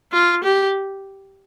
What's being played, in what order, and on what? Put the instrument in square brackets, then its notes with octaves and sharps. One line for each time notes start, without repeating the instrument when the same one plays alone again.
[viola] F4
G4